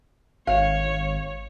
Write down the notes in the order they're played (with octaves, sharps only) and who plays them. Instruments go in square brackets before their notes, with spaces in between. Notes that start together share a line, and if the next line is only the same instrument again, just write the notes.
[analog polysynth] G#1 [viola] C#5 [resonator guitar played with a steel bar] F5